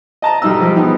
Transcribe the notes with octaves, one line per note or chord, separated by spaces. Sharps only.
D#5 A5 A#5
B1 G3 D#4 D#5 E6
F3 G3 G4 G#4
F3 B3 D#4